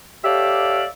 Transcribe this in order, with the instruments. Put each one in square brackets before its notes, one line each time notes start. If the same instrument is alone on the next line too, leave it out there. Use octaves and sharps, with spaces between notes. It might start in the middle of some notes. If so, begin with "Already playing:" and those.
[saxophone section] G4 A4 C#5 D5 E5 F5